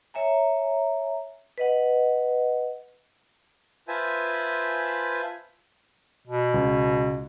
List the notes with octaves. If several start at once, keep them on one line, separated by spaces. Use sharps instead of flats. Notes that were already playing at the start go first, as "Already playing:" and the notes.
C#5 E5 G#5 A#5
B4 D#5 F#5
F4 B4 C5 E5 G#5 A5
B2
C#2